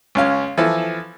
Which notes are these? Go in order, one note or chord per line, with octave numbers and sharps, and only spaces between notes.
C#2 C#4 F5
E3 F3 A4